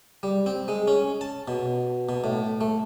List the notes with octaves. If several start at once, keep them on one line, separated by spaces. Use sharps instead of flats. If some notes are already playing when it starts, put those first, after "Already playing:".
G3
C4
G#3
C#4
A5
B2
B2
A2
A3